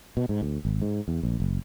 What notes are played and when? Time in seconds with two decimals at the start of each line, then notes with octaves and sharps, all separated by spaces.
0.17 B2
0.29 G#2
0.42 D2
0.65 G#1
0.82 G#2
1.08 E2
1.23 A#1
1.40 F#1